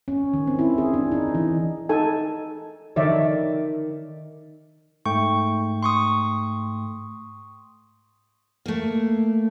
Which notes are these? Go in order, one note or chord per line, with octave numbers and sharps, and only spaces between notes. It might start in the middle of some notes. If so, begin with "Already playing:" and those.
C#4
D#3
C4
E4
G#4
D4
D#4
E3
D#4 A4 G#5
D#3 C#5 D5 E5
G#2 A3 G5 C#6
C6 C#6 D#6
A3 A#3